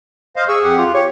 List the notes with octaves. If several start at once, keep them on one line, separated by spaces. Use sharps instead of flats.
C5 D#5 F5
G#4 C#6 E6
F2 G4 F#5
F4
G4 C#5